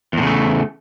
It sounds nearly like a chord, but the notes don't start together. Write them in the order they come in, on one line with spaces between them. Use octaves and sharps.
E2 A2 C#3 A3